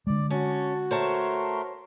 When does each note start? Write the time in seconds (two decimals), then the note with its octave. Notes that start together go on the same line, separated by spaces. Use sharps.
0.07 D3 G#3 D5
0.31 C#4 F#4 A5
0.91 A3 A#4 C5 C#5 A5 C6